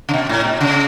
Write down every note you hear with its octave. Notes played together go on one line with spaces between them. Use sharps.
C#3
B2
A2
B2
C#3